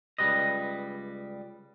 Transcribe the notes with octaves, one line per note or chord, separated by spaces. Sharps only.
C#2 B2 G3 B4 D#5